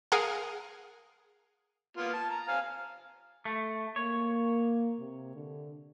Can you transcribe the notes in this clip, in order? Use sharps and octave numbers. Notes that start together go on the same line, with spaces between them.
G#4 A#4 F5 F#5 G#5 F6
A#3 B3 F4
A5
A#5
C5 F5 G#5
A3
A#3 C#5
C3
D3